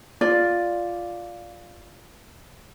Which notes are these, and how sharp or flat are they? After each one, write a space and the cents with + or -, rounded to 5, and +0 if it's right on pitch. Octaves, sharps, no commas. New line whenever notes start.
F4 +0 D5 +0